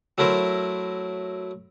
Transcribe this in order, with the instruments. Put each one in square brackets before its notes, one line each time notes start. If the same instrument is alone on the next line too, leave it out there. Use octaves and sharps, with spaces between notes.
[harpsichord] F#3 A3 E4 A#4 C5